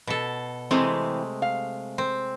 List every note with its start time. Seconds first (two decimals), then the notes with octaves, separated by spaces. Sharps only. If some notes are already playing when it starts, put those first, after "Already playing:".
0.07 B2 A4
0.71 C3 E3 G#3 A3 C4
1.42 F5
1.98 C4